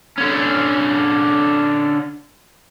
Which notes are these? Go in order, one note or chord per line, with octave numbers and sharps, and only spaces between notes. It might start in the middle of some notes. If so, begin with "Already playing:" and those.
D3 C#4